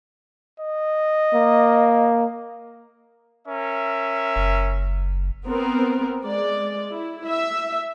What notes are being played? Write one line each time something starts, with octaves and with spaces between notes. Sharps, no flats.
D#5
A#3
C#4 A#4 E5
F#1
B3 C4 A#4
G#3 D5
E4
E5